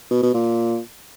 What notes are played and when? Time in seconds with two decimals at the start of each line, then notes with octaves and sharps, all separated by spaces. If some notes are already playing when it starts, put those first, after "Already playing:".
0.11 B2
0.22 B2
0.34 A#2